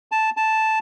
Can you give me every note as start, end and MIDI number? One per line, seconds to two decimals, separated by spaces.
0.12 0.30 81
0.37 0.79 81